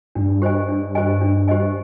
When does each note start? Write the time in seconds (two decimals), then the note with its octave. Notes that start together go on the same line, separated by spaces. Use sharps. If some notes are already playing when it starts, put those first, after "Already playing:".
0.15 G2 D4
0.42 G4 C5 D#5 G#5
0.69 D4
0.95 G4 C5 D#5 G#5
1.21 D4
1.48 G4 C5 D#5 G#5